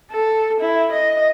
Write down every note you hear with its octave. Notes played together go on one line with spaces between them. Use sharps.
A4
E4
D#5